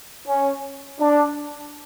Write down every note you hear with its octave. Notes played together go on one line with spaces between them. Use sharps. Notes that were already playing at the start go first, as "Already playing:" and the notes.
C#4
D4